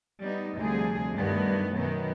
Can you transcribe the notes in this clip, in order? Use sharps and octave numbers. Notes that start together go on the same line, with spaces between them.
G3 B3 D#4
D2 C3 F3 G3 G#4
G2 D#3 F#3 G3 A3 B3
F#2 B2 D#3 F#3 B3